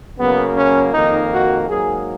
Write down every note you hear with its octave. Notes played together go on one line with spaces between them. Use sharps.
C#3 F#3 A#3 B3
C#4
F2 D#3 A#3 D#4
F#4
G#2 F#3 A#3 G#4